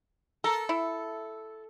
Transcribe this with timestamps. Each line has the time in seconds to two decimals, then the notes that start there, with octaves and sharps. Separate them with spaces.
0.44 A4 A#4
0.69 E4